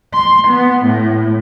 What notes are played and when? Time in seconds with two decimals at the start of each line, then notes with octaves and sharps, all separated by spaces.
0.14 C6
0.49 B3
0.86 A2